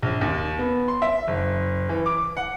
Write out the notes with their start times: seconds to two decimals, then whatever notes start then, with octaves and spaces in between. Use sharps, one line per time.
0.02 A#1
0.21 D#2
0.59 B3
0.88 C6
1.02 E5
1.27 F#1
1.89 E3
2.06 D6
2.37 F#5